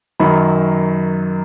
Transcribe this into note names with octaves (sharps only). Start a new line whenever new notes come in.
F#2 D#3 F#3 B5